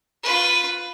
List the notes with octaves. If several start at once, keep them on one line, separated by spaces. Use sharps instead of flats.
F4 B4